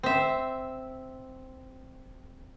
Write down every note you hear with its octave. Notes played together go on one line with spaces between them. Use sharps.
C4 E5